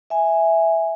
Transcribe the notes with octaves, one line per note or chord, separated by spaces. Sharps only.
E5 G#5